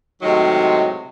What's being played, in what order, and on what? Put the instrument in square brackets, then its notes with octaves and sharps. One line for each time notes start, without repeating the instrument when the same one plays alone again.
[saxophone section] A2 C3 D#3 F#3 G#3